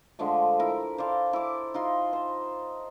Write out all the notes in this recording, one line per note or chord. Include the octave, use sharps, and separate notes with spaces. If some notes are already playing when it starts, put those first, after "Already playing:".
D3 F3 G#3 A3
E4 A#4
C5 D5 F5 A5
E4 D6
D#4 F4 C6
C5